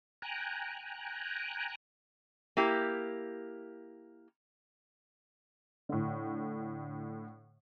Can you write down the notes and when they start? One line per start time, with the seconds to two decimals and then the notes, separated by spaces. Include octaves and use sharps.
0.22 G5 G#5 A#5 F#6
2.57 A#3 E4 G4
5.89 A2 D3